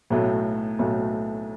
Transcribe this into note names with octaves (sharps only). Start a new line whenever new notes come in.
B1 A2 F#3 A3
B1 A2 F#3 A3